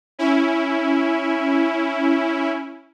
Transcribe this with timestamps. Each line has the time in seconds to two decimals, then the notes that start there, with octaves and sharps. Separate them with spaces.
0.19 C#4 E4